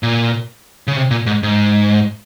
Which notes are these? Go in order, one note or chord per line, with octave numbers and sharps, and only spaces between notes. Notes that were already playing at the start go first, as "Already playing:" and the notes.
A#2
C#3
C3
A#2
G#2
G#2